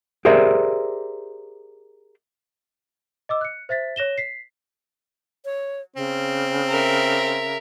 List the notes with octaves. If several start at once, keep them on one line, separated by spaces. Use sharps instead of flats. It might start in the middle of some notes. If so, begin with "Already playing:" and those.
G4 G#4 A#4 C5 D5 E5
D#5 D6 E6
F#6 C#7
C5 E5 A6 B6
C#5 A#6 E7 G7
B6 C7
C#5
C#3 C4
A#4 E5